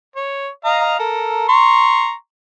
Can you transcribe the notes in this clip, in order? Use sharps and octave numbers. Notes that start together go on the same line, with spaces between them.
C#5
D#5 F5 A#5
A4 A#4
A#5 C6 C#6